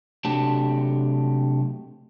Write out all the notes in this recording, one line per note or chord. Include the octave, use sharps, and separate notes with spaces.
C3 F#3 A3 D4 G4 A5